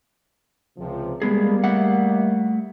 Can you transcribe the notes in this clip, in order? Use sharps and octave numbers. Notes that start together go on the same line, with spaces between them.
C#2 C3 F3
G3 G#3 A#3 B3 G#4
A3 E5 F#5